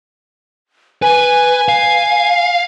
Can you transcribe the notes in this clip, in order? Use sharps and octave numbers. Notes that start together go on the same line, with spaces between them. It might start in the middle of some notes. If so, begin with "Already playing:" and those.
B4 G#5
F5